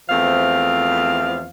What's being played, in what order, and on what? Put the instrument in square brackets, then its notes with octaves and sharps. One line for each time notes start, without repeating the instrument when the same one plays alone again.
[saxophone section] E2 F3 A3 C4 F5